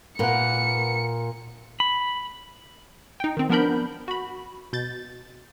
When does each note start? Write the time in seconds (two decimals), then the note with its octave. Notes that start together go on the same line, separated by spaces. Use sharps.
0.19 A#2 A#3 B4 F#5 C#7
1.80 B5
3.20 D#4 G5
3.37 D#3 C4
3.49 F3 B3 D4 A#4 B5 G6
4.08 F#4 B5
4.73 B2 G6 A6